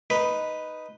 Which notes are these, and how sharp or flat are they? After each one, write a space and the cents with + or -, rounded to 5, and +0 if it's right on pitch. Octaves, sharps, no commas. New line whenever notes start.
D#4 +0 B4 +0 B5 +0